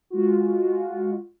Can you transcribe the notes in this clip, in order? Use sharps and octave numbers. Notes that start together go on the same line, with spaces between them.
G#3 F4 F#4